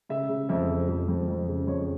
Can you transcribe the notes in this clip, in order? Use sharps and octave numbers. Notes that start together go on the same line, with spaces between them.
C#3 E5
C#3
F2 E5
F2
F2
F2
F2
C#3
F2 C#5